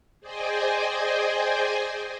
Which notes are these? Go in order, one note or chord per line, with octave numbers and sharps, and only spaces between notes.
G#4 C5 D5 D#5 G5 G#5